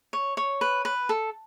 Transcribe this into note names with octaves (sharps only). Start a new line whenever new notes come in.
C#5
C#5
B4
B4
A4